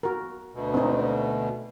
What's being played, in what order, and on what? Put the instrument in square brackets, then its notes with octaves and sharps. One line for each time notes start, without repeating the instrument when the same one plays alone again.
[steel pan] F#4 A#4
[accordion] D2 B2
[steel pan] C4 D#4